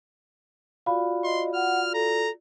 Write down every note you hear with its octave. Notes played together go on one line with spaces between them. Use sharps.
F4 F#4 D5 F5 B5
D#5 C6
F#5 F6
A4 A#5